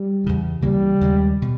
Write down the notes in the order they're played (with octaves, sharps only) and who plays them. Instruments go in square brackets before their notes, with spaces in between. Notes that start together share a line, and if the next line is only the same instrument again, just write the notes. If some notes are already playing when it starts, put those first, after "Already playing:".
Already playing: [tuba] G3
[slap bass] E2 C#3 E3
[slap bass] C#2 C#3 E3 A#3 [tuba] G3
[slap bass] D#2 C#3 G#3
B2